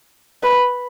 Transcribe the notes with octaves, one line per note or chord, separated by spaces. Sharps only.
B4